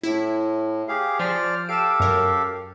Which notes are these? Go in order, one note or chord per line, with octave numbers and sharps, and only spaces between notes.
A2 E4
G4 G#4 F5
F3 C5 D5 F6
G4 A4 F5 D7 E7
F#2 A#4